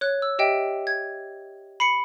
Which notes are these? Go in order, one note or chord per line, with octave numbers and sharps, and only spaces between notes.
C#5 F#6
E6
G4 D#5 E5 G5
G#6
B5 C7 C#7